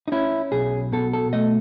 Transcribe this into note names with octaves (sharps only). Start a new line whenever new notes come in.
D#4
C#4 E4
B1 G#4
B2 A4
A4
A3 D#5